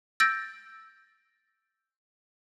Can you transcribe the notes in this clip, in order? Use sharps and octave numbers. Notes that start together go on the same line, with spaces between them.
E6 G6 A6 A#6 D7